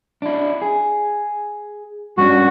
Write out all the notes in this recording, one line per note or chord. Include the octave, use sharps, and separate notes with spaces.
D4 E4
G#4
G2 C#4 D4 F#4